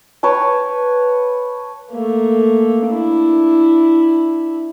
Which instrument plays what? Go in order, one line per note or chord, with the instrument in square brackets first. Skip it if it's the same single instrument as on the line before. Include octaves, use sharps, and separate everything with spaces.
[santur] B4 C#5 G5 A5
[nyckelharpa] A3 A#3
D4 E4